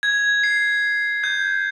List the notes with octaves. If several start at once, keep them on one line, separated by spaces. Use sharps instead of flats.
G#6
C7
G6